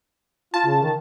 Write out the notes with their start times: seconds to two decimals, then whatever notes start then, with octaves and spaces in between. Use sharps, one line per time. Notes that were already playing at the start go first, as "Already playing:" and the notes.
0.54 F4 A5
0.66 C#3
0.82 D#3